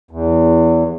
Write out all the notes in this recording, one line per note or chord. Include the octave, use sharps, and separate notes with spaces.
E2